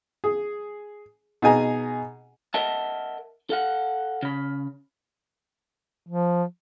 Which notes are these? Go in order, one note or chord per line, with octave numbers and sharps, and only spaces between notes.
G#4
B2 D#4 G#4 G#5 A#5
A#4 D#5 E5 F#5 A5
A4 F5 F#5
C#3 B5
F3